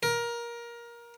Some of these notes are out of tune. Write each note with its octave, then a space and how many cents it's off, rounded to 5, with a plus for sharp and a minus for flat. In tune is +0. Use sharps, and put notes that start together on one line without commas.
A#4 +20